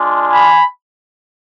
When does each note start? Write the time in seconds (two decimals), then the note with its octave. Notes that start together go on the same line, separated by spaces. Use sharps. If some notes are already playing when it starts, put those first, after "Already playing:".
Already playing: G#3 D4 F4
0.31 G#5 B5